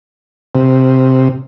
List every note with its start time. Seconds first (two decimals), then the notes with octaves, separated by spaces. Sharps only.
0.55 C3